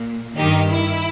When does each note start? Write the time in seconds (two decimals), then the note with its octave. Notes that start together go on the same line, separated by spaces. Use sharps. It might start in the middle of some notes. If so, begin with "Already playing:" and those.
Already playing: A#2
0.38 G2 D#3 D#4 G4
0.70 E4